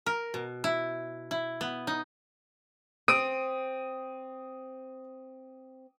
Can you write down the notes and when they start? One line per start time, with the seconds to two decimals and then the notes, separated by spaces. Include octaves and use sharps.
0.06 A#4
0.34 B2
0.64 E4
1.31 E4
1.61 B3
1.87 D#4
3.08 C4 D#6 D7 D#7